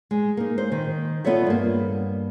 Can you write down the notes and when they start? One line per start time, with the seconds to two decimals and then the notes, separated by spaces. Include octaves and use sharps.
0.11 G#3
0.37 A#3 D#4
0.58 C5
0.72 D#3
1.24 B3 F4 A4 C#5 D5 E5
1.47 G2 A#3